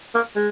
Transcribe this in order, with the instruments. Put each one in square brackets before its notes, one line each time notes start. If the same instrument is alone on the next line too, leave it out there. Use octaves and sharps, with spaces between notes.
[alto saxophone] A#3
G#3